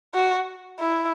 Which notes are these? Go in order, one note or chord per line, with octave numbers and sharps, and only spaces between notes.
F#4
E4